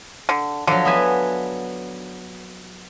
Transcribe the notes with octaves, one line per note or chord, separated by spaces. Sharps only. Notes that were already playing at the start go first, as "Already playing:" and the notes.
D3
D3 F3 F#3
B3 E5 G#5